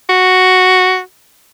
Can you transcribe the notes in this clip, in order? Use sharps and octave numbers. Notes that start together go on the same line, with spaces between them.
F#4